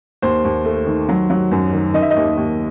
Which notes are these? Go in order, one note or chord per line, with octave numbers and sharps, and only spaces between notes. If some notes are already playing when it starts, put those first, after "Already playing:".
D#2 C5
D#2
A3
D#3
F#3
F#3
F#2
D#3
D#3 D#5
E5
D#5
D#2
D#2